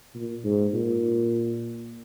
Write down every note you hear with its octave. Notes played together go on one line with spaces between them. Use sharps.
A#2
G#2
A#2